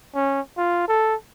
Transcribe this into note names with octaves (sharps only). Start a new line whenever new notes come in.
C#4
F4
A4